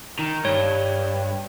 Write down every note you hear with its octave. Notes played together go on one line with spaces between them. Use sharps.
D#3
G2 C#5